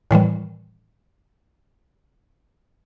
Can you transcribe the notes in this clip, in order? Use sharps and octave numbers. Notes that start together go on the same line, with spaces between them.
A2 D#3 E3 G3